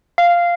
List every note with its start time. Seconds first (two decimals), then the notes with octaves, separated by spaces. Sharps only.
0.18 F5